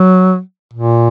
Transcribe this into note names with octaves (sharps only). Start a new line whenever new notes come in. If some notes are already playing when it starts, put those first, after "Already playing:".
Already playing: F#3
A#2